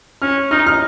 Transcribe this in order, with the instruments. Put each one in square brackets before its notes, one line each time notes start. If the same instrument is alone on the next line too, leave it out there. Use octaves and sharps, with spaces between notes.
[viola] C#4 [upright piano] F6
[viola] D#4 [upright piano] F6
[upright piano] F6